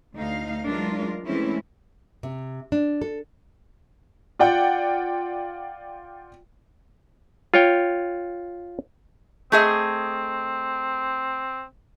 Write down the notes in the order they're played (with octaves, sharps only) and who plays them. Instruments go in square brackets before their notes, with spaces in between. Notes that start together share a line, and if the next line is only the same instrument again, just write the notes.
[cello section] D2 D#4 F5
E3 F#3 G#3 D4 F4 A#4
E3 G#3 A3 C4 C#4 E4
[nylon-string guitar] C3
D4
A4
[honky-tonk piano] F4 D5 F#5 G5
[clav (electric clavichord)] F4 C#5 G5
[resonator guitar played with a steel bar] A3 G#4 D#5 [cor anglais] C4